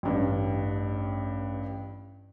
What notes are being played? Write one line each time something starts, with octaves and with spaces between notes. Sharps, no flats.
A1 G2